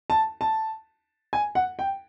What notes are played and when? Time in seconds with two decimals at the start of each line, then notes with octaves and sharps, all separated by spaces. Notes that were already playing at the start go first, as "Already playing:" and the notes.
0.10 A5
0.41 A5
1.33 G#5
1.55 F#5
1.79 G5